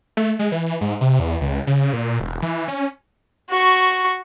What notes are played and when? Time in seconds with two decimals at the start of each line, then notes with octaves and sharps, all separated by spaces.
0.17 A3
0.39 G#3
0.52 E3
0.81 G#2
1.01 C3
1.19 E2
1.41 C#2
1.67 C#3
1.93 A#2
2.20 E1
2.42 E3
2.68 C#4
3.50 F#4 C#6